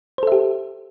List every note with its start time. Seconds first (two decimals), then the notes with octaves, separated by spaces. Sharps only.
0.18 C5
0.23 A4
0.27 E5
0.32 G4